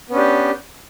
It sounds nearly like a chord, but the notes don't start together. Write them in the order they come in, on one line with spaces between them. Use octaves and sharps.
B3 C#4 D4 G4